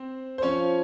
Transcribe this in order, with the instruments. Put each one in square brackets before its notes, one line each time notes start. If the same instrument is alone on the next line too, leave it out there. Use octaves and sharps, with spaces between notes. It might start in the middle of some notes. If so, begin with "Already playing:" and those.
Already playing: [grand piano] C4 C5
C5
[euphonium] F3 [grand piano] C#4 C#5